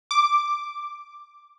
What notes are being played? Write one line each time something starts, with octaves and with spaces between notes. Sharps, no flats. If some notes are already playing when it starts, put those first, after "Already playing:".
D6